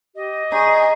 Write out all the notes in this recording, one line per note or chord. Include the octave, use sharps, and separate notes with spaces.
G4 D#5
D#4 G#4 C#6